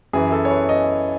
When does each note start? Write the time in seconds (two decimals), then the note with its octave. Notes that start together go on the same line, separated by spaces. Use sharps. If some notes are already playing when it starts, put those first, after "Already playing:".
0.13 F#2 E3 G#4
0.32 A4
0.45 C#5
0.51 B4
0.69 D#5